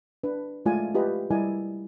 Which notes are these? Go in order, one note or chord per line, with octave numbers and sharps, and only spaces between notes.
D4 B4
G#3 A3 F4 D5 G#5
F4 G4 B4 D#5
G3 E4 A#4 D5 D#5 G#5